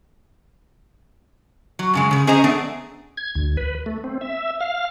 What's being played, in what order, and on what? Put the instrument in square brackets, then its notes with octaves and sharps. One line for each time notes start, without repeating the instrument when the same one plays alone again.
[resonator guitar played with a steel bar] F#3
F#2 C#3 G#3
C#3 G#4
C#4 G#4 C5 D#5 G#5 A#5
A3 B3 D4 G#4
[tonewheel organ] G#6
D2
B4
A3
C4
E5
F5